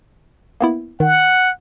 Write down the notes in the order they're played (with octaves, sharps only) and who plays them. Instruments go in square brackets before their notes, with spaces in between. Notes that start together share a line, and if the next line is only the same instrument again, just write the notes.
[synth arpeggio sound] A#3 B3 E4
[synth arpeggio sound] D#3 [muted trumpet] F#5